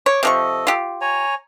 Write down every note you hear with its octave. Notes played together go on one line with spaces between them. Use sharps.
C#5 D6
C3 F3 A4 D#5 C#6
F4 G4
C#5 G#5 A#5